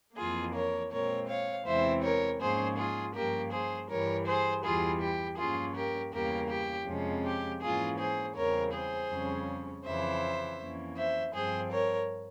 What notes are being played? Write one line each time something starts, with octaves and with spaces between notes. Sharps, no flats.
F2 E3 A#3 F4 G#4
A#4 C#5
A#2 G#3 C4 A#4 C#5
C#5 F5
E2 C3 E3 G#3 C4 C5 E5
A#4 C#5
G#2 F3 A#3 C#4 G#4 C5
F4 G#4
G2 F3 A#3 C#4 G4 A#4
G#4 C5
G2 E3 G3 A#4 C#5
G#4 C5
E2 E3 G3 F4 G#4
G4
G2 F3 A#3 C#4 F4 G#4
G4 A#4
E2 C#3 G3 A#3 C#4 G4 A#4
G4
F2 C3 F3 G#3 C#4
G4
G#2 E3 A#3 C#4 F4 G#4
G#4 C5
E2 C#3 G3 C4 A#4 C#5
G#4 C5
F2 C#3 G3 C#4
F2 C#3 E3 C5 E5
F2 E3 A#3 C#4
C5 E5
G2 F3 C4 G#4 C5
A#4 C#5